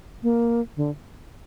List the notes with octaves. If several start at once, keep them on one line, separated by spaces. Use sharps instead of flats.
A#3
D3